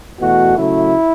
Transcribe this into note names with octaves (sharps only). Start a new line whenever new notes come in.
E2 B2 A3 F#4
C#3 F#3 A3 E4